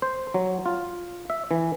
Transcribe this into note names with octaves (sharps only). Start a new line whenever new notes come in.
C5
F#3
F4
E5
E3